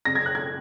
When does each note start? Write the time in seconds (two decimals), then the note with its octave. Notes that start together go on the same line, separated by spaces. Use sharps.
0.05 F#1 A#6
0.15 G#6
0.26 F#6
0.35 G#6